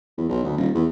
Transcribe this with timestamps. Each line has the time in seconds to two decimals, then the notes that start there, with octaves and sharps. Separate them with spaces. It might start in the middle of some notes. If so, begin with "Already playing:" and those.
0.18 E2
0.29 B1
0.44 D2
0.57 D#1
0.75 E2